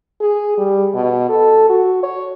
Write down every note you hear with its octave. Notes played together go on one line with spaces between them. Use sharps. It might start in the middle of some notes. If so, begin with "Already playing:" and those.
G#4
G3
B2
A4
F#4
C#5